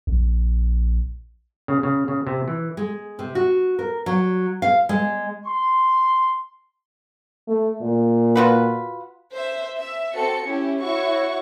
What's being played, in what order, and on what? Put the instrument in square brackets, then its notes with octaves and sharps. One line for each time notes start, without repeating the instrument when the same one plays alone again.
[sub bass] A#1
[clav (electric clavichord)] C#3
C#3
C#3
C3
E3
[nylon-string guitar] G#3
C3
F#4
A#4
F#3
F5
G#3
[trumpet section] C6
[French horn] A3
A#2
[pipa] F4 F#4 B4
[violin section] C5 E5
E5
C4 F#4 A4 C#7
C#4 E4 G4
E4 F#4 C#5 C#6